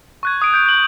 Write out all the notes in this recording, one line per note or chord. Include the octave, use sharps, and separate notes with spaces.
C#6 F#6 G#6
D#6 D7
G6 D7
G6 F#7